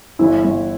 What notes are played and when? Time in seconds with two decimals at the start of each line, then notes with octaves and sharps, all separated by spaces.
0.19 G1 E3 E4
0.44 G1